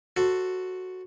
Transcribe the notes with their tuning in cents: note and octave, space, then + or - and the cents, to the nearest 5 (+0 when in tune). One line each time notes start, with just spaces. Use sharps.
F#4 +0 A4 +10 C5 +0